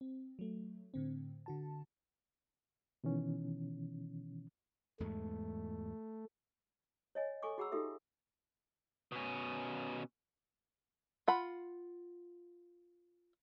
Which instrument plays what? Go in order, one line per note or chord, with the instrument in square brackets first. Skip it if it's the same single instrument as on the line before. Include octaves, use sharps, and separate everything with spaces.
[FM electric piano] C4
F#3 A3
A2 D3 C4
D3 F#4 A5
[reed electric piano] B2 D#3 E3 C#4
[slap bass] E2 G#2 G#3 [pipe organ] A3
[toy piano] C#5 D#5 G#5
A4 G#5 C#6 D6
F#4 G#4 F#5 A#5 B5 E6
D#4 F4 G4 A4 E5
[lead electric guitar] B2 C#4
[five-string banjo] F4 F#5 B5